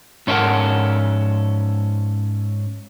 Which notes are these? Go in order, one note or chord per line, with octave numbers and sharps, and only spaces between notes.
G#2 C#4 D#4 A4 A#4 F#5